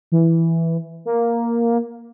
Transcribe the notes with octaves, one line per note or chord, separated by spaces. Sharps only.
E3
A#3